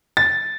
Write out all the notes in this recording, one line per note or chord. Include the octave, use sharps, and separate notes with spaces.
A6